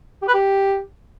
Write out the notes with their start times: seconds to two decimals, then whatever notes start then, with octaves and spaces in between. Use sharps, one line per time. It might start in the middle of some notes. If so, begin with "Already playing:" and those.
0.22 G4
0.28 B4
0.34 G4